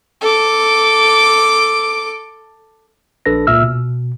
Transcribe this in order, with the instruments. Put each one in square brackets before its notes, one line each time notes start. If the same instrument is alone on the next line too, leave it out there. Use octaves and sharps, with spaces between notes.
[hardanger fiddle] A4 D6
[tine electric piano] A#1 D4 A4 B4 A#6
C#2 A#2 E5 E6 F6
B2